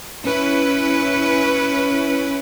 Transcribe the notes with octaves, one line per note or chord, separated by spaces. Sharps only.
C#4 E4 B4